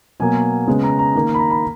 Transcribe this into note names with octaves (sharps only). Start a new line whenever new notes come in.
B2 F#3 A#3 G#5
C#3 G#3 B3
A#5
A#5
D#3 A#3
B5
A#5
B5